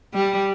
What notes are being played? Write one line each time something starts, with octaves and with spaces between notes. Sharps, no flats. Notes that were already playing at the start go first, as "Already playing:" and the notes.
G3